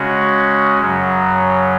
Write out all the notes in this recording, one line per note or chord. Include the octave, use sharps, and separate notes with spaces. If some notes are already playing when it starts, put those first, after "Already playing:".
Already playing: C#3 G#3 C#4 F#4
F#2 C#3 F#3